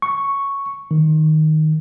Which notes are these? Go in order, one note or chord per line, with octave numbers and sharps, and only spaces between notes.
C#6
D#3